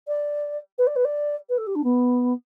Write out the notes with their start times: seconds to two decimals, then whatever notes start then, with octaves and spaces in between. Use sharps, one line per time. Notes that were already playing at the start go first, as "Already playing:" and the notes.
0.08 D5
0.78 B4
0.87 D5
0.96 B4
1.05 D5
1.49 B4
1.58 A4
1.67 G4
1.75 D4
1.84 B3